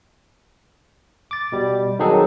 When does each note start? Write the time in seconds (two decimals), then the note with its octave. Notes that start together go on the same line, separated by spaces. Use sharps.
1.31 D6 A6
1.52 B2 G3
1.99 D#3 F#3 C4 D#4 G#4 A4